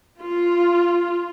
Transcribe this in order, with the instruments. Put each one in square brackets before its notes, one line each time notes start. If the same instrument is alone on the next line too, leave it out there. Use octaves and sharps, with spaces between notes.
[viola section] F4